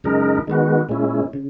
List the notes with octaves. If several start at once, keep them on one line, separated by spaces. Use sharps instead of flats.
F#2 C#3 G#3 D#4 A#4
D#3 G#3 B3 F#4
A#2 G#3 C#4 E4
C#3